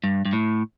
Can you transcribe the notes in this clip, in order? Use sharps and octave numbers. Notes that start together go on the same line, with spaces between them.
G2
G2
A2